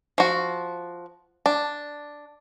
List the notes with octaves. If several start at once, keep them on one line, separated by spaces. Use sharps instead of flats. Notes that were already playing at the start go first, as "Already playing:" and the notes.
F3 F#4
D4